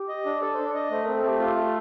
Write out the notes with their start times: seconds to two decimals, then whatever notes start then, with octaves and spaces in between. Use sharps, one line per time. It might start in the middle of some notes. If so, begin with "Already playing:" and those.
Already playing: G4
0.09 D#5
0.26 D4
0.41 A4 D5
0.54 D4 C5
0.66 D5
0.74 D#5
0.90 A3 C5
1.03 C4 A#4
1.15 A4
1.24 A3 G4
1.39 F4 G4
1.56 A3 G4
1.64 A4